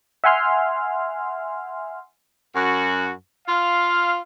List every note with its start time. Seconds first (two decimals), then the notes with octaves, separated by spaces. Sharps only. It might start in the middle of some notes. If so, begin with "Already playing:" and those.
0.24 E5 F#5 G#5 C6 F6
2.55 F#2 F#4
3.47 F4 F5